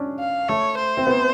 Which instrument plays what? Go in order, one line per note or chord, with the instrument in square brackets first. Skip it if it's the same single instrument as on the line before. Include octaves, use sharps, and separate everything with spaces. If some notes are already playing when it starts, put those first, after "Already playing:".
Already playing: [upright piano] C#4 D4
[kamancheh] F5
[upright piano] A3 [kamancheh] C#5
[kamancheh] C5
[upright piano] C4
B3